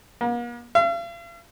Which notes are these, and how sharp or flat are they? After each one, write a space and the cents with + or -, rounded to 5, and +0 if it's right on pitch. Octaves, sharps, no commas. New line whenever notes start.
A#3 +45
F5 -45